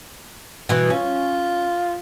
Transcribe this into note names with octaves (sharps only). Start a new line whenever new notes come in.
B2 E3
C#4 F4